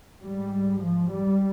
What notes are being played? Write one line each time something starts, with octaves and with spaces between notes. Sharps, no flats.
G#2 G3
F3
G3